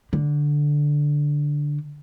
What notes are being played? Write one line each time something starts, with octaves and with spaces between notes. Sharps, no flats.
D3